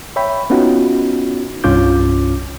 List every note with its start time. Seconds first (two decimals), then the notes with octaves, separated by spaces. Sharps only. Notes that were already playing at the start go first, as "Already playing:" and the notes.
0.16 C#5 E5 G5 B5
0.50 B3 C#4 D#4 F4 F#4
1.64 C2 G2 C#4 F4 D6 G6